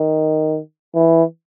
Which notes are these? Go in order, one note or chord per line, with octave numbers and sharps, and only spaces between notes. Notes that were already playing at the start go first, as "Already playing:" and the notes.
Already playing: D#3
E3